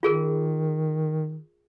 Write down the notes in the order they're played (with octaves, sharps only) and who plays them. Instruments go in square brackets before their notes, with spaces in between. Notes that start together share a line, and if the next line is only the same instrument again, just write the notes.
[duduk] D#3 [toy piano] F4 G#4 A#4